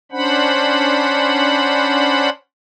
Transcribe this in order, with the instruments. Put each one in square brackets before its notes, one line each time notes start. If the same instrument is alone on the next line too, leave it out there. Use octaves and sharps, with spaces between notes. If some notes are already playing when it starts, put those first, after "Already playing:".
[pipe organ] C#4 D4 C5 F#5 B5